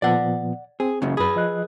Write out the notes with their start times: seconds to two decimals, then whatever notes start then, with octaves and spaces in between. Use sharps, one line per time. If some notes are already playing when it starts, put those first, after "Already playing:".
0.02 A#2 F3 B3 D5 F#5
0.80 C4 G#4
1.02 C#2 F#2 C#3
1.17 F#2 G#4 B4 B5
1.36 F3 D#5 F#6